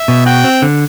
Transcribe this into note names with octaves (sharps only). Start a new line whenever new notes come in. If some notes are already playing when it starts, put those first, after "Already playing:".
Already playing: E5
B2
F#4 G5
C4
D3